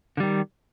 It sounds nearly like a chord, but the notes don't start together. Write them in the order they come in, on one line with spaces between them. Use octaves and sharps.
D3 G3 D#3